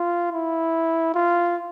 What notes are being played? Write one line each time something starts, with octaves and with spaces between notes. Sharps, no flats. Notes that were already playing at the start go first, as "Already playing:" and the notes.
Already playing: F4
E4
F4